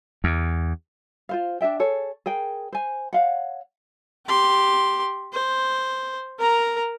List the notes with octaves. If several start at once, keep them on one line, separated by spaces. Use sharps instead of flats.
E2
F4 C5 F5
D4 G#4 E5 G5
G#4 A4 C#5
G#4 A#4 G5
C5 G#5
C#5 F5 F#5
G4 C6
C5
A#4 A#5